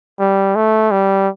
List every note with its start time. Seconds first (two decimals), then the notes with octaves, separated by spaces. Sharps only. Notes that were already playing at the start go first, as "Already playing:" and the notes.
0.20 G3
0.56 A3
0.91 G3